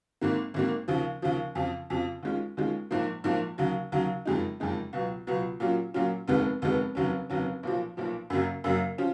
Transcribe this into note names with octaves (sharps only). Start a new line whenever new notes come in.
G#1 G#2 D#3 A#3
G#1 G#2 D#3 A#3
D#2 C#3 F3
D#2 C#3 F3
F2 C#3 F3
F2 C#3 F3
D#2 D#3 G#3 C#4 F4
D#2 D#3 G#3 C#4 F4
A#1 G#2 F3 A#3
A#1 G#2 F3 A#3
D#2 C#3 F#3
D#2 C#3 F#3
F#1 F2 D#3 G#3 D#4
F#1 F2 D#3 G#3 D#4
C#2 B2 F#3
C#2 B2 F#3
A#2 F#3 C#4 F4
A#2 F#3 C#4 F4
F1 D#2 D#3 G#3 B3
F1 D#2 D#3 G#3 B3
F1 D#2 C#3 F#3 C#4
F1 D#2 C#3 F#3 C#4
B1 A#2 F3
B1 A#2 F3
F#2 C#3 F#3 A#3 C#4
F#2 C#3 F#3 A#3 C#4
F3 C#4 F4